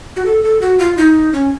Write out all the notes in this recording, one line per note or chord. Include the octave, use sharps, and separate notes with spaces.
F#4
A4
A4
F#4
F4
D#4
C#4